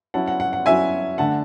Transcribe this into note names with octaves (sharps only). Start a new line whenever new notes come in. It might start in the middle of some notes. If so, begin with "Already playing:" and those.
F#3 C#4 E4 F#5 A5
F#5
F#5
F#5
F#3 C#4 E4 E5 G#5
D3 A3 D4 F#5 A5